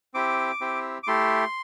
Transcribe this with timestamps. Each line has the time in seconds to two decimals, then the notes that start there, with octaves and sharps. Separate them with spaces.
0.14 C4 E4 G4 D6
0.61 C4 E4 G4
1.03 D6
1.07 A3 E4 G4 C6